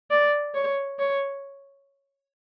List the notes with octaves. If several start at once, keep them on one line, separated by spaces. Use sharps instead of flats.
D5
C#5
C#5